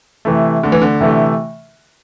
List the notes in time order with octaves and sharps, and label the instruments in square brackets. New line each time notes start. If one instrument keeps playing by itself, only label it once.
[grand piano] C3 E3 A3
[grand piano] D2 [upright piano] D3
[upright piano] E3
D3
[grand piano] C3 E3 A3